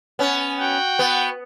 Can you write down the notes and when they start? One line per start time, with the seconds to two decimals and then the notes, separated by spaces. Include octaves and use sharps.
0.19 B3 C#4
0.59 F#4 F#5 G5
0.99 B3